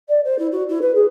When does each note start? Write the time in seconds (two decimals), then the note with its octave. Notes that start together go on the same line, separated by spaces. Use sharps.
0.08 D5
0.24 C5
0.38 E4
0.52 F#4
0.68 E4
0.81 B4
0.94 G#4